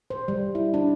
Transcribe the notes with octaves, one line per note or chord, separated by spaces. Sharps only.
C5
G3
E4
D4